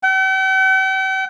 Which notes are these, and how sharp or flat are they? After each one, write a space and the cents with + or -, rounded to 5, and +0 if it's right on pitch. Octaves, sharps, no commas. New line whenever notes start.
G5 -45